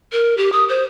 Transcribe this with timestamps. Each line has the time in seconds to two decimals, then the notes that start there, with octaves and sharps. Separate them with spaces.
0.12 A#4
0.37 G4
0.53 D#6
0.69 C5